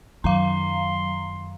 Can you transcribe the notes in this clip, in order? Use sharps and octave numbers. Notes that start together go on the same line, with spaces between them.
F#2 D#3 F#3 F5 A#5 C6